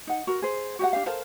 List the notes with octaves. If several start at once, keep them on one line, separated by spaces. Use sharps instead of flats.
D#4 F#5
F#4 A#4
G#4 C5
F#4 G4 D#5 F#5
D4 G4 F5
A4 A#4 C5 F5